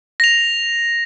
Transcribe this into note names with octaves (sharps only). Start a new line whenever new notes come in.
A#6 F7